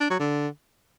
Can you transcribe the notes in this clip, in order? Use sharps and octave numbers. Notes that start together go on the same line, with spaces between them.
D4
F#3
D3